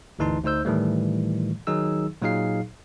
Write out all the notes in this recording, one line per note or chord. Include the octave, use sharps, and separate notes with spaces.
G1 D2 E3 D#4 A5 C6
D2 D#4 C5 E6 G6
A2 D#3 E3 G3 A3
D#3 F#3 D#4 G#4 E6
A#2 F#3 D#4 G#4 F5 C7